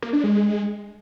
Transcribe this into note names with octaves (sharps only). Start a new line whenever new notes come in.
A#3
D4
G#3